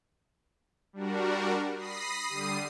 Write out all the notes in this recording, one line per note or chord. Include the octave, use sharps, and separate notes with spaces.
G3 D4 F#4 A#4
B5 D#6 A#6 C7
D3 G3 D#6 C7 D#7